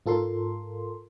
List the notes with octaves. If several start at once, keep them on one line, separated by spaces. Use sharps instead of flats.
G#2 F4 A4 A#4 C6